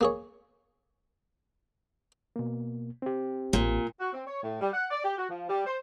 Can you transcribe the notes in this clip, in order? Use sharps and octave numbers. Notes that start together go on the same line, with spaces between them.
A#3 G#4 C#5
B2 A#3
C4 G4
A1 A#2
F#4
C4
C#5
A2
G3
F#5
D5
G4
F#4
F3
G3
C5